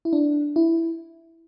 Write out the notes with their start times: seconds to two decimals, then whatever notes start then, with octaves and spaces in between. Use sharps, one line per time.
0.05 E4
0.13 D4
0.56 E4